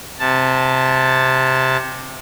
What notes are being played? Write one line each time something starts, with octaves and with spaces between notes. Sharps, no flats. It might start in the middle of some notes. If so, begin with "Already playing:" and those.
C3 A5